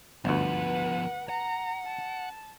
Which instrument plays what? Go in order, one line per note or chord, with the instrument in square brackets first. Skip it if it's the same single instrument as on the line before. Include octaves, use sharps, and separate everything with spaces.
[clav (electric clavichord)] G1 D2 [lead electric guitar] F3 B3 [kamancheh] B4 F#5
[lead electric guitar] F#5 [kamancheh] A#5
[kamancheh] A5